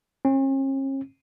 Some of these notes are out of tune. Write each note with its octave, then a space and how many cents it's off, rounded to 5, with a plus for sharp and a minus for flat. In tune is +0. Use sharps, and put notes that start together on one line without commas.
C#4 -45